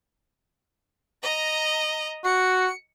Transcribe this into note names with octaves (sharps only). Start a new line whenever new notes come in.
D#5 A#5
F#4 C#7